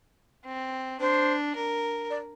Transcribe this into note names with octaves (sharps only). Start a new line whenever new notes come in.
C4
D4 C5
A#4
D5